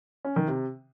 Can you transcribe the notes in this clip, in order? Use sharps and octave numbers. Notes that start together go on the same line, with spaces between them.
C#4
D#3
C3